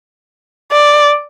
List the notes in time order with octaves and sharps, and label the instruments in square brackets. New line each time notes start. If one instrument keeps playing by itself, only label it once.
[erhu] D5